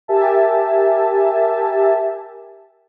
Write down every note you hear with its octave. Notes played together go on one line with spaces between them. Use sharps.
G4 A#4 E5 G#5 A5